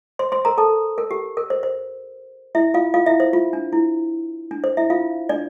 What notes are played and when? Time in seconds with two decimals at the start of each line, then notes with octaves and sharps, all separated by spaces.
0.19 C5 C6
0.32 C5 C6
0.45 A#4 A#5
0.58 A4 A5
0.98 A#4
1.11 G4
1.37 A#4
1.50 C5
1.63 C5
2.55 E4 E5
2.74 F4 F5
2.94 F4 F5
3.06 E4 E5
3.20 C5
3.33 F4
3.53 D4
3.73 E4
4.51 D4
4.64 C5
4.77 E4 E5
4.90 F4 F5
5.29 D4 D5